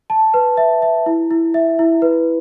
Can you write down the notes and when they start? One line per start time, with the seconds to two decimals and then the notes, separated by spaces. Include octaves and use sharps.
0.10 A5
0.34 B4
0.57 E5
0.82 E5
1.06 E4
1.31 E4
1.54 E5
1.79 E4
2.02 B4